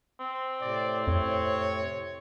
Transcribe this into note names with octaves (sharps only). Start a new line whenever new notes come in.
C4
A2 C3 D5
F2 C#5